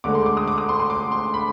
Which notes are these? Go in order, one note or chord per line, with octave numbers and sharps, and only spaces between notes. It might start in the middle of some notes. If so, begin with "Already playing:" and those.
D2 D3 G#3 D6
C6
D6
D#6
D6
D#6
C6
C6
D6
C6
B5